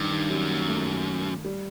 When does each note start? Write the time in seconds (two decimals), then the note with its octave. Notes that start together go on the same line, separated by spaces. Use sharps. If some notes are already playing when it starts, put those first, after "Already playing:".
Already playing: G2 D#3
0.11 D#3
0.30 F#2 G3
0.49 A#3
0.68 A3
1.45 G3